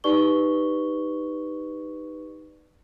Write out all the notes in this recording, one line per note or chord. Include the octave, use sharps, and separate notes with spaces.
D#4 G4 B4 D5 C#6 G7